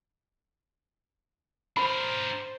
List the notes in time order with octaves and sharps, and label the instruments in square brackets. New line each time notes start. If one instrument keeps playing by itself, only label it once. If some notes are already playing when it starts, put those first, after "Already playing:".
[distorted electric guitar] D4 A#4 [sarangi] C5 [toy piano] B5